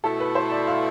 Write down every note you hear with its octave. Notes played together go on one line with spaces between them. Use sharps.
B2 A3 E4 A4
B4
C5
D5
F5